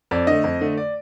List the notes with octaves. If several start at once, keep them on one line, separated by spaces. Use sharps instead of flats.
F2 D5
D3 A3 D#5
F2
D3 A3
D5